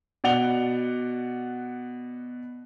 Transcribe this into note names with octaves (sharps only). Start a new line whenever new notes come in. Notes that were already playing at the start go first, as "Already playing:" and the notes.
B2 D5 F#5 F7 G7